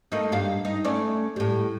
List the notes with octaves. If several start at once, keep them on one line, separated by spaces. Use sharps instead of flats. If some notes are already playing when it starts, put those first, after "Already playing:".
A3 A#3 D#4
G2 G3 F5
D#4
A3 C#4 D5
A2 G3